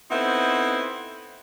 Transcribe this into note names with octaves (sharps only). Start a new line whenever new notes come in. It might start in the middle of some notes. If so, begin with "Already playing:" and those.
B3 C4 D#4 E4 A4 C5